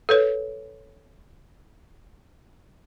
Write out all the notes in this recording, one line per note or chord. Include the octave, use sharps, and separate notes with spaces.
A4 B4 C#5